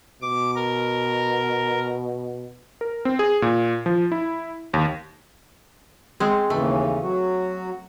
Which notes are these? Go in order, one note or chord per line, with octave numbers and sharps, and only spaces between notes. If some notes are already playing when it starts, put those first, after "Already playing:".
B2 D6
A#4
A#4
C4
G#4
A#2
F3
E4
D#2
G#3 C4
D#2 C#3 E3 A3
F#3 F#4